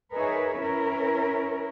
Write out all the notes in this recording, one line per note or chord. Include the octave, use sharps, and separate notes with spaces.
D#4 G#4 A#4 B4 C#5 E5
C#4 E4 A#4 B4